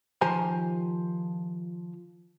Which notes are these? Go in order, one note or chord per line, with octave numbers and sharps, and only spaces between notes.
D#3 F3 G4 C5 G#5 A#5